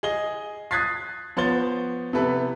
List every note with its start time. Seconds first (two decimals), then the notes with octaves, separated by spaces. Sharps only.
0.03 G#4 D#5 G7
0.71 D#6 F#6 G#6 A6 B6 C7
1.37 F3 B3 C5 C#5 A6 G7
2.13 C3 B3 E4 A4 B4